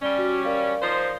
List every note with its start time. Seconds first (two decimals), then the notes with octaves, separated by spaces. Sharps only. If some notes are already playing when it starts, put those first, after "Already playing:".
0.02 G3 C#4 D5 G7
0.18 F#4
0.45 A#4 D5 F5
0.82 F3 D#4 C5